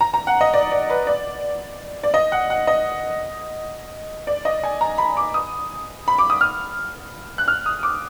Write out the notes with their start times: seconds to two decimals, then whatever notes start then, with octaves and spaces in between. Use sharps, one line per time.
0.01 A#5
0.14 A#5
0.27 F#5
0.41 D#5
0.54 D5
0.72 D5
0.90 B4
1.07 D5
2.03 D5
2.14 D#5
2.32 F#5
2.50 F#5
2.67 D#5
4.27 D5
4.45 D#5
4.63 G#5
4.81 A#5
4.98 B5
5.17 D6
5.34 D#6
6.08 B5
6.19 D6
6.30 D#6
6.41 F6
7.38 F#6
7.48 F6
7.66 D#6
7.83 D6